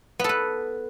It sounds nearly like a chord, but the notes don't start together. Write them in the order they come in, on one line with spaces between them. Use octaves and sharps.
B3 A4 B4